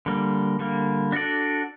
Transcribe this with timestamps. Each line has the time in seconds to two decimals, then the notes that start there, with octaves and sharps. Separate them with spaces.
0.06 D3 G3 A#3
0.59 D3 G3 A#3
1.12 D4 F#4 A4 D5